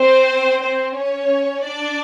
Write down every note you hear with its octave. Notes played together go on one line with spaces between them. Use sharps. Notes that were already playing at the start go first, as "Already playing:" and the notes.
Already playing: C4 C5
C4 C5
C#4 C#5
D4 D5